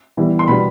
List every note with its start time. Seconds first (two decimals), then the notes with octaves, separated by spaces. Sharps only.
0.17 E3 G3 B3
0.39 C6
0.48 B2 G3 B3 D4 B5